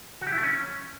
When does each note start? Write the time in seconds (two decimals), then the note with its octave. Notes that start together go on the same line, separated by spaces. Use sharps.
0.21 F#4
0.27 G4
0.32 E4
0.38 A3
0.43 C#4